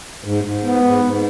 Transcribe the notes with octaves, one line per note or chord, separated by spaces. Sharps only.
G#2
G#2
B3
G#2
G#2